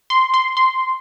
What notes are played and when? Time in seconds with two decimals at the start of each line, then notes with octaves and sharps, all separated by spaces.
0.10 C6
0.34 C6
0.57 C6